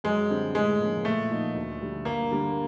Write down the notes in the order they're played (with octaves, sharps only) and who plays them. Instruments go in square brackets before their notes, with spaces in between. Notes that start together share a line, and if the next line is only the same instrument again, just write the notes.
[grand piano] F#2 [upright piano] G#3
[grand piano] D3 G3 C4
[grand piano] A2 [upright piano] G#3
[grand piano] F3 A#3 C#4
[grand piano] A#2 [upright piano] A3
[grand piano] F3 A#3 D#4
D2
D3 G3
[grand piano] G2 [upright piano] A#3
[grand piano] D3 G3 A#3